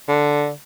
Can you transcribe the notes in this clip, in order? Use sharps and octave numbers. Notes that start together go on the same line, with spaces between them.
D3